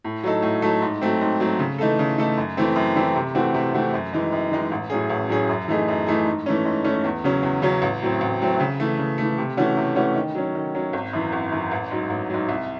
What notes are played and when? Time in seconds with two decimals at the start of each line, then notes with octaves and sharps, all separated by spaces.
0.04 A2
0.23 F#3 A3 D#4 A4
0.42 A2
0.62 F#3 A3 D#4 A4
0.82 G#2
1.01 F#3 A3 C4
1.21 G#2
1.40 F#3 A3 C4
1.59 C#3
1.78 E3 A3 D#4 A4
1.99 C#3
2.18 E3 A3 D#4 A4
2.37 F#2
2.57 E3 A3 C4
2.76 F#2
2.96 E3 A3 C4
3.16 C3
3.35 E3 A3 C4 F#4
3.54 C3
3.73 E3 A3 C4 F#4
3.94 F#2
4.13 E3 G#3 D#4
4.32 F#2
4.51 E3 G#3 D#4
4.71 A1
4.90 A2 F#3 C#4 G#4
5.10 A1
5.29 A2 F#3 C#4 G#4
5.49 F#2
5.68 E3 A3 D#4 G#4
5.88 F#2
6.07 E3 A3 D#4 G#4
6.26 G#2
6.46 E3 A3 C#4
6.65 G#2
6.84 E3 A3 C#4
7.04 E2
7.24 C#3 F#3 C#4
7.43 E2
7.62 C#3 F#3 C#4
7.82 A1
8.02 A2 F#3 C4
8.21 A1
8.40 A2 F#3 C4
8.60 C#3
8.80 E3 A3
8.99 C#3
9.18 E3 A3
9.38 C3
9.57 E3 A3 C#4 F#4
9.77 C3
9.96 E3 A3 C#4 F#4
10.15 D#3
10.35 F#3 C#4
10.55 D#3
10.75 F#3 C#4
10.93 G#1
11.13 F#2 E3
11.32 G#1
11.52 F#2 E3
11.71 A1
11.91 G#2 F#3
12.10 A1
12.30 G#2 F#3
12.49 C2